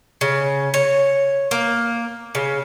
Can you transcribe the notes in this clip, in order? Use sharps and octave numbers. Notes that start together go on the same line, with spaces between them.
C#3
C#5
A#3
C#3